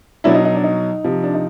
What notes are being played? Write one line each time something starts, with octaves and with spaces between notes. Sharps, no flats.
B2 F#3 D4 E4
D#4
D#4
D4
D#4
C3 F3
D4
D#4